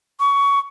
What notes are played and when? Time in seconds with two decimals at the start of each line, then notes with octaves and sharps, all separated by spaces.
0.20 C#6